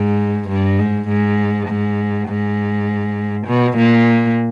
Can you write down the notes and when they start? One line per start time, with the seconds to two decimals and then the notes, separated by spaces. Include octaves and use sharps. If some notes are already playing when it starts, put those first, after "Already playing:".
Already playing: G#2
0.49 G2
0.79 G#2
1.09 G#2
1.69 G#2
2.28 G#2
3.47 B2
3.77 A#2